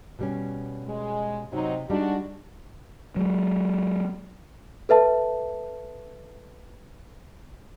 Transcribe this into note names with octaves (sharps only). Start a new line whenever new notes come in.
B2 G3 C#4
G#3
C3 F#3 C4 D#4
G3 G#3 D4 D#4 F#4
F#3 G#3
A4 B4 E5 A5